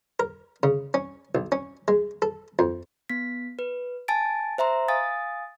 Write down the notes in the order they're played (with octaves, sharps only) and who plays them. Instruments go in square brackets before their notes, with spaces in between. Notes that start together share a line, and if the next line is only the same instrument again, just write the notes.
[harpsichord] A#4
C#3
C#4
B1
C#4
G#3
A4
F2
[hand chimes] B3 B6
B4
G#5 A5 A6 D7
C5 E5 A#5 C6
F5 G#5 D#6 A6